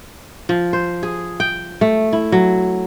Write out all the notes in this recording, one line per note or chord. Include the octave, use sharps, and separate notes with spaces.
F3
C5
G#4
G5
A3
E4
F#3